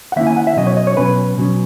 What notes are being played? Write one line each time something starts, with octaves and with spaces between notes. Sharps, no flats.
F#5
D#3 A#3 C#4 E4 E5
G#5
F#5
E5
B2 F#3 C#4 D#5
C#5
D#5
C#5
B2 F#3 C#4 B4
B2 F#3 C#4